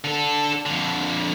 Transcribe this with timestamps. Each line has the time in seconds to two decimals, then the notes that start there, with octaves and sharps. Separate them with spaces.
0.04 D3 A4
0.66 F2 D3